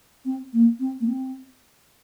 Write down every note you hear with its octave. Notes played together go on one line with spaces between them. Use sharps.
C4
A#3
C4
A#3
C4